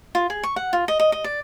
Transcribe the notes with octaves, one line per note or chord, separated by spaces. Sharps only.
F4
G#4
C#6
F#5
F4
D#5
D#5
D#5
D5